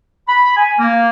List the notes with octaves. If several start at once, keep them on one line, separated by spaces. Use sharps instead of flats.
B5
G#5
A#3